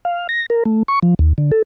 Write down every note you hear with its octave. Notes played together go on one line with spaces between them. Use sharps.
F5
A#6
A#4
A3
C#6
F3
D#2
D3
A4